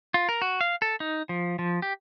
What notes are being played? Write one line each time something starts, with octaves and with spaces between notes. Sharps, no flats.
F4
A#4
F#4
F5
A4
D#4
F3
F3
G4